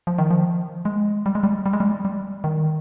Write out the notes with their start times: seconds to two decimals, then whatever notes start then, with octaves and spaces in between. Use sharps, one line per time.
0.07 F3
0.18 D#3
0.31 F3
0.85 G#3
1.26 G3
1.35 G#3
1.43 G3
1.66 G3
1.73 G#3
1.80 G3
2.05 G3
2.44 D#3